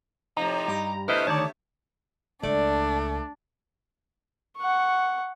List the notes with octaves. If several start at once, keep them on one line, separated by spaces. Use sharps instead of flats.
A2 C3 F3 D#4 A#5
G2 G4
D3 A3 B3 E4 B4 C5 D#5 F6
D2 D#3 C#5 D5 A5
C#2 A3 D4 D5
F#5 C#6